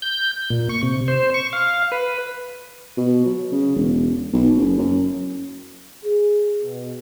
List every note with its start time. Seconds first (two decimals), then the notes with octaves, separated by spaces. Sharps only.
0.02 G6
0.50 A#2
0.69 C#6
0.83 C3
1.08 C5
1.34 C#6
1.53 F5
1.92 B4
2.97 B2
3.26 F#3
3.52 C#3
3.76 E1
4.33 B1
4.57 F#1
4.78 F#2
6.05 G#4
6.62 B2